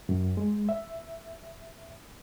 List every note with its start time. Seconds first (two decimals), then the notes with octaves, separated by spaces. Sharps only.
0.09 F#2
0.37 G#3
0.69 E5